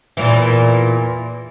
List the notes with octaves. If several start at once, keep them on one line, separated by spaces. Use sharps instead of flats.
E2 A#2 E3